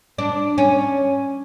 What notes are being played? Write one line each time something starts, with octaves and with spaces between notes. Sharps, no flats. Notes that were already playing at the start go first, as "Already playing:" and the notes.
D4
C#4